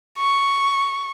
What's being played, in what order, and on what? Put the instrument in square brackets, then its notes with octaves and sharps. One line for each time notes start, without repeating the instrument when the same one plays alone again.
[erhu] C#6